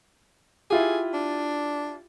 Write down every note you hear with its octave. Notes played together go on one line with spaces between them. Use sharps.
E4 F4 G4 G#4
D4